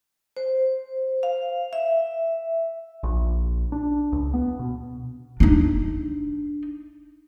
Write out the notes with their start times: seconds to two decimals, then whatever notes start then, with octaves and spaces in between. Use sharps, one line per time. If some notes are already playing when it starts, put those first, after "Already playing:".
0.37 C5
1.23 F5
1.73 E5
3.03 A#1
3.72 D4
4.12 C#2
4.34 B3
4.59 B2
5.40 D4 D#4